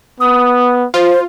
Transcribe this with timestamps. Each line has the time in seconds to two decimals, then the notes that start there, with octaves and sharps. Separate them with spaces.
0.20 B3 D#6
0.94 F4 C5